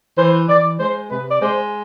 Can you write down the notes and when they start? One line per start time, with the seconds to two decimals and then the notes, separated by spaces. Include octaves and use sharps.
0.18 E3 C5
0.49 E3 D5
0.80 G#3 C5
1.11 C3 B4
1.30 D5
1.42 G#3 C5